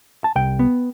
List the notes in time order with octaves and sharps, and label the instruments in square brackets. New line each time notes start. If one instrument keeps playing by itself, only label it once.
[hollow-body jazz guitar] A5
C2 G5
B3